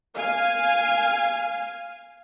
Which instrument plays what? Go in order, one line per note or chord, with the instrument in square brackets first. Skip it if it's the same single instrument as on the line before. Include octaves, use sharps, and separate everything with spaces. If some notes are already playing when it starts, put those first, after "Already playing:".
[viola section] F5 G#5